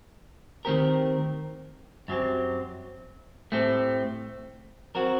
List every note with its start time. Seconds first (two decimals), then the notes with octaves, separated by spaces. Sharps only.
0.65 D#3 A3 C4 G4 A#4
2.08 F#2 F#3 C4 G4
3.52 A2 A3 C4 G4
4.95 F#3 C4 F#4 A#4